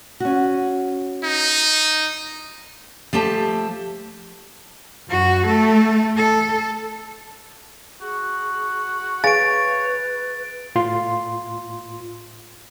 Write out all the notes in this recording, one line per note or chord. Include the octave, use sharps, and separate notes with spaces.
C#4 F#4
D#4
F3 A3 G4 A5
F#2 F#4
A3 A4
A4
F#4 G#4
G#4 B4 C#5 F5 G#5 A6 D7
A2 F4 C6